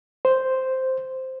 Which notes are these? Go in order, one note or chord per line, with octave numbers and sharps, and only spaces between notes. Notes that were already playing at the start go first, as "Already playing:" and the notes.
C5